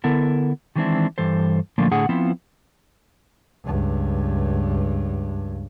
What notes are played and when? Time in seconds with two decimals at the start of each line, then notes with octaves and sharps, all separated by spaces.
0.04 D3 B3 E4 A4 A#4
0.76 D#3 E3 G#3 C4 D4 E4
1.18 G2 E3 A4 C5
1.78 A#2 D3 F3 A3 A#3
1.91 A2 D3 G#4 F#5
2.09 F3 B3 C4 E4 F4
3.64 C#2 G2